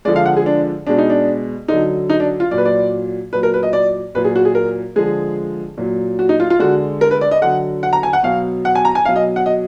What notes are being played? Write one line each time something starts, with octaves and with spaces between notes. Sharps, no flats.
D3 F3 G#3 D5
F5
F#5
G#4
D4
B2 G#3 D4
D#4
D4
D3 F#3 D#4
D#4
D4
F4
A#2 F#3 D5
B4
D5
A#2 F#3 B4
A#4
B4
D#5
D5
A#2 F#3 B4
G#4
F#4
G#4
A#4
D3 F3 G#3 G#4
A#2 F#3
F#4
D#4
F4
F4
D3 G#3 F#4
A#4
B4
D5
D#5
D3 F#3 F#5
F#5
A#5
G#5
F#5
B2 F#3 F5
F#5
G#5
A#5
G#5
B2 F#3 F5
D#5
F#5
D#5